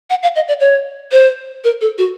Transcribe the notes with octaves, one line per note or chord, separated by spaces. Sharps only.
F#5
F5
D#5
D5
C#5
C5
A#4
A4
F#4